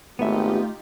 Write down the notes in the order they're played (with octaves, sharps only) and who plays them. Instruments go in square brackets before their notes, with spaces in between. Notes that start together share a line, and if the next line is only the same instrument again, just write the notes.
[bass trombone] G#1 [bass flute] A3 [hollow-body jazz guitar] B3 E5 [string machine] D#4 F4 G4